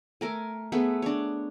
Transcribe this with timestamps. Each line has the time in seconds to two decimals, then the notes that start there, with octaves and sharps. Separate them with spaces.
0.21 A3 A#4 G#5
0.72 A3 B3 G#4 B4
1.02 D4 C#5